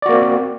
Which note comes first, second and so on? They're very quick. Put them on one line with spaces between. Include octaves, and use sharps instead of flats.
D5 F#4 A#3 C4